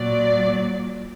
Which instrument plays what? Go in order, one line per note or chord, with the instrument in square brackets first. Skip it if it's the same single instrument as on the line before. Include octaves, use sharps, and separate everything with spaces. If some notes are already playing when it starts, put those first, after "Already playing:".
Already playing: [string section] A#2 F#3 D5